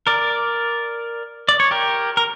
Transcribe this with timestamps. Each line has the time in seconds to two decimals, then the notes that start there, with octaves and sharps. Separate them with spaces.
0.07 A#4 D5
1.49 D5
1.60 C#5
1.71 G4 A#4
2.17 A#4